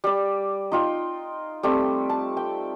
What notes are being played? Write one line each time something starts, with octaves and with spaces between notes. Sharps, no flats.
G3 D5
D#4 F4 G5
G3 A3 C4
A5
G5